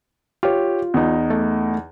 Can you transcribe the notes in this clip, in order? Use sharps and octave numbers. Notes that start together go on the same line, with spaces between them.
F4 G4 C#5
E2 D#4
A3